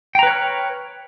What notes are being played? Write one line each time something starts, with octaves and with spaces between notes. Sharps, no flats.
B4 C#5 G5 A#5 F6